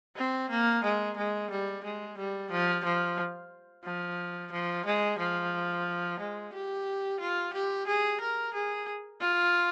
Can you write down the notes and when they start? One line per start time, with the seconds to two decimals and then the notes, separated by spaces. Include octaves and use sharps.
0.16 C4
0.50 A#3
0.84 G#3
1.17 G#3
1.50 G3
1.84 G#3
2.18 G3
2.50 F3
2.84 F3
3.84 F3
4.52 F3
4.85 G#3
5.18 F3
6.20 G#3
6.53 G4
7.20 F4
7.53 G4
7.87 G#4
8.21 A#4
8.54 G#4
9.21 F4